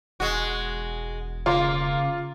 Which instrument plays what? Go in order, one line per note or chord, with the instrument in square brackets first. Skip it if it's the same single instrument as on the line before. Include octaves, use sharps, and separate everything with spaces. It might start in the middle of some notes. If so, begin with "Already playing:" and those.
[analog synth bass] E1 [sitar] G#3 F#4
[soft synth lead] C#3 [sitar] A#3 [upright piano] F4 C6 D6